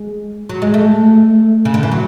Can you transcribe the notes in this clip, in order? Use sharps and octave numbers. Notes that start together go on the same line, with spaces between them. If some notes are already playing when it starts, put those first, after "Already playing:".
Already playing: G#3
F#3
G#3
A3
C#3
D3
E3
F#3